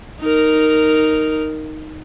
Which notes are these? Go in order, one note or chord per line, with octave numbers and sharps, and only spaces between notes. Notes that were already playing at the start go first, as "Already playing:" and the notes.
D#4 A#4